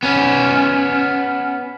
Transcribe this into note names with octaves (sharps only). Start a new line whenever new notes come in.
B3 C#4